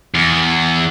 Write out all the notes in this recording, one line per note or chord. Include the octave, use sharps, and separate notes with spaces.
E2